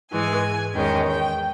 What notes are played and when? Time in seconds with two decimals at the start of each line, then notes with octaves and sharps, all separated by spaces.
0.12 G#2 E3 G#3 G#5
0.75 E2 D#3 G#3 C#4 G5
1.07 G5